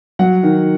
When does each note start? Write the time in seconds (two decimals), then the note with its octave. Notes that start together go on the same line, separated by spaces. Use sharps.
0.19 F#3 F#5
0.43 D#3